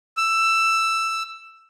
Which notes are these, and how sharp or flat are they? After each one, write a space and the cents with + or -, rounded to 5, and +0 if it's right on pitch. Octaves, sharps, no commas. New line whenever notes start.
E6 +10